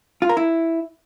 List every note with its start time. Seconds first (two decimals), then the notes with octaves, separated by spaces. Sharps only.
0.22 F4
0.29 A#4
0.37 E4